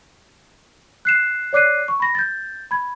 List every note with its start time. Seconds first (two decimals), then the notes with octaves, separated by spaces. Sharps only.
1.05 F#6 C7 E7
1.53 C#5 D5 D6 F#6 C7 D#7
1.88 C#6
2.00 B5 A#6
2.15 G6 A6
2.71 B5 G#6